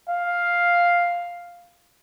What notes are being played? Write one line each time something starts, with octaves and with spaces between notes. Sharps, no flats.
F5